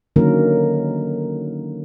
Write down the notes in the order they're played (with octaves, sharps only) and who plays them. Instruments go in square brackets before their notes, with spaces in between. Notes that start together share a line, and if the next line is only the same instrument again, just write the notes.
[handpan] D3 D#3 F#3 A#3 C#4 A#4